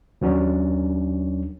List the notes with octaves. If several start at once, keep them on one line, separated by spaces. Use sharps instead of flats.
D#2 F#3 C#4 D4